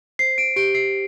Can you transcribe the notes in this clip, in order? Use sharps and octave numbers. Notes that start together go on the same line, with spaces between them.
C5 C7
D7
G4 D7
C7